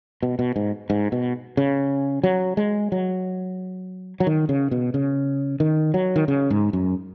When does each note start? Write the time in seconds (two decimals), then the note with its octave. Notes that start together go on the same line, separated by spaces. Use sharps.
0.23 B2
0.39 B2
0.56 G#2
0.90 G#2
1.12 B2
1.57 C#3
2.24 F#3
2.57 G#3
2.92 F#3
4.20 F#3
4.27 D#3
4.49 C#3
4.71 B2
4.94 C#3
5.60 D#3
5.94 F#3
6.16 D#3
6.28 C#3
6.50 G#2
6.73 F#2